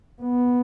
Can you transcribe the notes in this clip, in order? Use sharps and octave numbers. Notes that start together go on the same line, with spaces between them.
B3